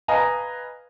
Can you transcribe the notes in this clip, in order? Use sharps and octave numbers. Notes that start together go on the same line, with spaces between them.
B4 D#5 F5 G#5 A#5